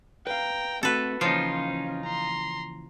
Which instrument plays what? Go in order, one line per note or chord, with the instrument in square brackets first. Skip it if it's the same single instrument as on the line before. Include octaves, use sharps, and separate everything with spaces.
[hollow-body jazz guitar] B4 F5 [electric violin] G5 A#5
[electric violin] A3 F#4 [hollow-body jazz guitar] C4 F#5 [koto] A4 B4
[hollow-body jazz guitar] C#3 E3 A#3 [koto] F3 [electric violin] C#4 [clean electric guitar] D#4 F4
[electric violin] A#5 C6